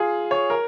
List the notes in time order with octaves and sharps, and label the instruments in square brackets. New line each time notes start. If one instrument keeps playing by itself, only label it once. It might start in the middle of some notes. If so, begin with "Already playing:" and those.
Already playing: [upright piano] F4 G#4
C#5
A#4